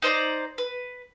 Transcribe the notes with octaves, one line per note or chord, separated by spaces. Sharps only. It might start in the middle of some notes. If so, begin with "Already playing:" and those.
D#4 C5 D5 A#5
B4